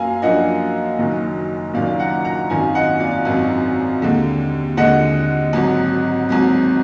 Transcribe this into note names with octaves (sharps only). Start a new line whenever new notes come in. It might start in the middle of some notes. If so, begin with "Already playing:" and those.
Already playing: F#2 A#3 F5 G#5 A#5
F#2 F3 A#3 D4 D#5 F#5
F#1 F#2 D#3
F#1 F#2 D#3 D5 F5
F#5 A#5
F#5 A#5
G#1 F#2 D#3 F5 G#5
D#5 F#5
D5 F5
G#1 F#2 D#3
D#2 D3 G#3
D#2 D3 G#3 D#5 F#5
G#1 G#2 F#3
G#1 G#2 F#3